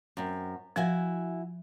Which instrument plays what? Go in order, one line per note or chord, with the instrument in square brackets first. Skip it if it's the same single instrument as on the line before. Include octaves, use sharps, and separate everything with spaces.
[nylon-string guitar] F#2 C4
[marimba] F3 [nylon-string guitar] E4 F#4 G#5